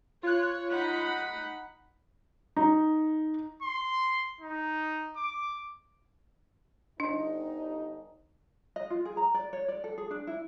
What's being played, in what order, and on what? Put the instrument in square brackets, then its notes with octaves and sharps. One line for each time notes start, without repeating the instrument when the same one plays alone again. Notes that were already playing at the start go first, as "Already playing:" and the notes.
[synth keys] F4 F#6 [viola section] C#5
[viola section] D#4 F#5 B5
[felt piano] D#4
[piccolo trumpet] C6
D#4
D6
[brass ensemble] G1 D#4 [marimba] D4 [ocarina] D#5
[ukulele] D#5
F4
G#4
A#5
D5
C#5
D5
A4
G#4
D4
E4